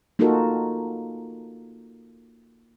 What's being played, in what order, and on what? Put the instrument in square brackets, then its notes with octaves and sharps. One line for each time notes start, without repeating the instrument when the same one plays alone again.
[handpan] A#3 D#4 F4 F#4 A4 A#4